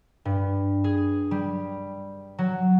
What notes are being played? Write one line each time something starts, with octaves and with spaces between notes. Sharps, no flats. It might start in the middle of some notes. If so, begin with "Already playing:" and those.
G2
G#4
G3
F#3